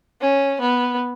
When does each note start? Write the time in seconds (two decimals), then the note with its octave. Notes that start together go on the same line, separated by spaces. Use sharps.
0.21 C#4
0.61 B3